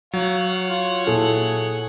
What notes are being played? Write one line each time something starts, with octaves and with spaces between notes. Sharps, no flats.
F#3 C#5 F5 F#5
F4
A#2 E4 G#4 A4